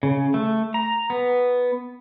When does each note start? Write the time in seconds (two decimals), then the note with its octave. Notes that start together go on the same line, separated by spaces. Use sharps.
0.03 C#3
0.34 A3
0.74 A#5
1.10 B3